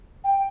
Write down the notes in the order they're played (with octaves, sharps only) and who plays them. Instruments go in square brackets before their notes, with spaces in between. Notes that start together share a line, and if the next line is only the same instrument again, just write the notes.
[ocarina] G5